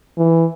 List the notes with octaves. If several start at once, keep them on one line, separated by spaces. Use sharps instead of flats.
E3